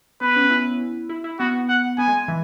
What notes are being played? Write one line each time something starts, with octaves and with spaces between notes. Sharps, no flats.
B3 B4
C#4
E4
E4
E4
B3 F#4
F#5
B3 G#5
G#3
E3